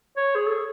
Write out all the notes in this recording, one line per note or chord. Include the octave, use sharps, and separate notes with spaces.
C#5
G#4
A4